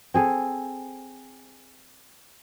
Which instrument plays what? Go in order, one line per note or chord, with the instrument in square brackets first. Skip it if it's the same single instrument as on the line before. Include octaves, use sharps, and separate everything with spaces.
[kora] C4 G#4 A4